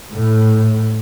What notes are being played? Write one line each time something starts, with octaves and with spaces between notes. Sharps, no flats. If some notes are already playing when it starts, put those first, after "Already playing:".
A2